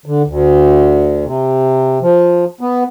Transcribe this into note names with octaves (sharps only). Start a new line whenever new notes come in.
D3
D2
C3
F3
B3